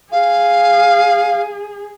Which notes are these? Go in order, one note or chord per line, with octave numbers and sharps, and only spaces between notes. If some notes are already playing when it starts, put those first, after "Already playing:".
G#4 F5